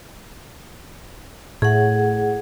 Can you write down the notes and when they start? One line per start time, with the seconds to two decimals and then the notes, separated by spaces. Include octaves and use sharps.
1.62 A2 G#4 F#5